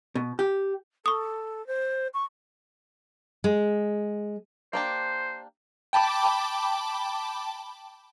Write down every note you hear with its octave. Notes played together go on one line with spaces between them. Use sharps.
B2
G4
A4 C#6 D#6
C5
C#6
G#3
A#3 D4 G4 C5
G5 A5 B5 D6